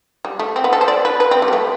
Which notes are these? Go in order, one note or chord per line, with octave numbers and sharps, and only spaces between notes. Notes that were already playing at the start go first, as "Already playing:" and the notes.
G3
A3
C4
B3
A4
C5
D5
B4
B4
C4
G3
B3
A3